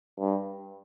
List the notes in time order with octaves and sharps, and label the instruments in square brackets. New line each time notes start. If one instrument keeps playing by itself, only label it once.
[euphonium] G2